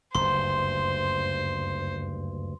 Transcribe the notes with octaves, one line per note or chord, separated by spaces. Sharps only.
F#1 D2 G2 C5 C6